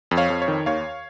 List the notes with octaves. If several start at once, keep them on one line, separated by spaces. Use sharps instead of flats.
F2
C#5 F5
F2
C#5
D#3
D#2 C#5 F5